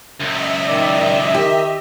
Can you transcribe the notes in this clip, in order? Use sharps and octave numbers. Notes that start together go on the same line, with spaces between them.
C#2 F#2 D#5 E5
D#3 D5
D#3 G4